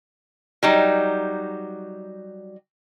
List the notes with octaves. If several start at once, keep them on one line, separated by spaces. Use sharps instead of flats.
F#3 G3 D#4